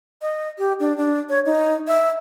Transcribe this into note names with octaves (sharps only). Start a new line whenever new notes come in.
D#5
G4
D4
D4
C#5
D#4
E5